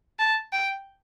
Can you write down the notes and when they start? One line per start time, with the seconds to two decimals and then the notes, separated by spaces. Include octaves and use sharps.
0.19 A5
0.53 G5